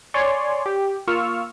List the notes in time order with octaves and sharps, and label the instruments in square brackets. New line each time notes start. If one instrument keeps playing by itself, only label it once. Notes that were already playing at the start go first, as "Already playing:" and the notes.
[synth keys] C#5 D5 G#5 C6
G4
A#3 F4 C#6 E6 F6